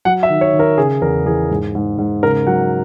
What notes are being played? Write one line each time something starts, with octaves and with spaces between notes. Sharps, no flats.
F#3 F#5
E5
D#3
C#5
D#3
A#4
C#3 G#4
E2 A#4
E3 G#4
G#2
G#2
G#2
C#3 A#4
F#3 F#5